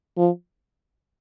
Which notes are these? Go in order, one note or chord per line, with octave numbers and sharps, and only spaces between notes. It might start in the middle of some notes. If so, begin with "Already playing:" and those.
F3